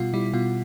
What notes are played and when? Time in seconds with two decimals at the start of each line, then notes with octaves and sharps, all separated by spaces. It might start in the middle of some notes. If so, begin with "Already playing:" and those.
Already playing: B2 G3 F4
0.14 G3 E4
0.33 B2 F4